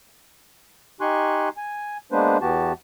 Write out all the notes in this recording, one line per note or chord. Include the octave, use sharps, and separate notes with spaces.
D#4 G4 G#5 C6 C#6 F#6
G#5
G#3 A#3 B3 D4 B4 C5
E2 E3 B3 F#4 G4 A5